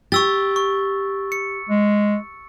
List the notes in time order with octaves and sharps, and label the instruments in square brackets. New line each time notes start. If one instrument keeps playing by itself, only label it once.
[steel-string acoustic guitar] G4 [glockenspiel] C#6 E6 A6
[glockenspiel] C#6
C#7
[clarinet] G#3